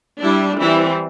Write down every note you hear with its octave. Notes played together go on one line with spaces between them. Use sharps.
G3 D4 E4
E3 G3 C4 E4